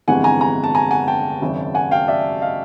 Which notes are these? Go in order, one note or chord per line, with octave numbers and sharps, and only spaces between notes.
G1 F2 C3 E3 G#3 F#5 G#5
G#5 A#5
G#5 A#5
A5
G#5 A#5
F#5 G#5
G5 A5
G#1 F#2 C#3
F#5 G#5
F5 G5
D5 E5
D#5 F5